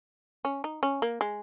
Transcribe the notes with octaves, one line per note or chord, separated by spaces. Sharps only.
C#4
D#4
C#4
A#3
G#3